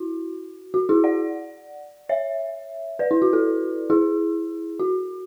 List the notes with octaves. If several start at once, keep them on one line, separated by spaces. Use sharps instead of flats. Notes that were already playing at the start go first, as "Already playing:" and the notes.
Already playing: E4 F#4
F#4
E4 G#4
D5 F#5
C#5 E5
B4 D5
E4
F#4
F#4 A4
E4 G#4
F#4